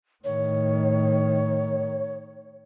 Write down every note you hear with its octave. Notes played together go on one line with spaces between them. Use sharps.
A2 D#3 C#5